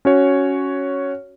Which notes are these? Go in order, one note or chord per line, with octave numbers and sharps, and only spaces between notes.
C#4 F#4 C#5